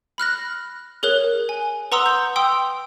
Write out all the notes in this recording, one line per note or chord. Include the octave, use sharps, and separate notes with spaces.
B5 F6 F#6 A#6
G#4 A#4 C#5 F#6
G#5
B4 F#5 A#5 C6 D#6 E6
G6
G5 C6 D#6 E6